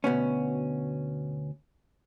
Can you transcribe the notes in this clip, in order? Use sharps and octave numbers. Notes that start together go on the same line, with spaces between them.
D2 B2 B3 C#4